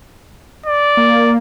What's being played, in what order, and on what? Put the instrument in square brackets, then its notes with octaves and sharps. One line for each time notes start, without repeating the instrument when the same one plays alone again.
[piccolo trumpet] D5
[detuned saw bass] A#3